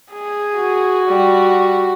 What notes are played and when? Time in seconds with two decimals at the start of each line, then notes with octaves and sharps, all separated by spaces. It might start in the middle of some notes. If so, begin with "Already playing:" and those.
0.11 G#4
0.56 F#4
1.07 G3